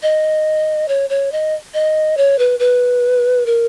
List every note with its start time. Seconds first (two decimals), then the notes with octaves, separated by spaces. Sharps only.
0.03 D#5
0.88 C#5
1.10 C#5
1.32 D#5
1.74 D#5
2.17 C#5
2.39 B4
2.59 B4
3.46 A#4